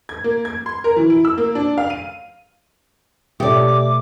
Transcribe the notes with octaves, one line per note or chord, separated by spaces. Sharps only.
G#6
A#3
G#6
C6
A#4
E3
E4
E6
A#3
D4
F5
D#7
B2 A3 G4 D5 D6